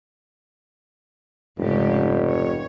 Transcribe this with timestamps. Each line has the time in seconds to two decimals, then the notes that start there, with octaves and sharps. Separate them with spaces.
1.58 F1 G#2 C#3 G4
2.28 C#5